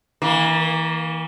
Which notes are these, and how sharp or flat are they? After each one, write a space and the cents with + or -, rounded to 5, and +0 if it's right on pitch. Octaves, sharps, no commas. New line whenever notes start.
E3 -30 A#3 +10